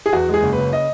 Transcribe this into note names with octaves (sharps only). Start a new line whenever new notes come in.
G#4
E2 F#4
G#3 G#4
F#1
B4
C#3
D#5